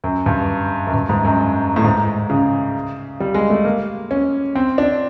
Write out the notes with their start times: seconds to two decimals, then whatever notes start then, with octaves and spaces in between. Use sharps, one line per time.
0.04 F#2
0.26 G2
0.87 F#2
0.94 G2
1.09 G#2
1.25 F#2
1.76 A2
1.84 G#2
2.30 C#3
3.20 G3
3.35 G#3
3.50 A3
3.65 A#3
4.11 C#4
4.55 C4
4.78 D4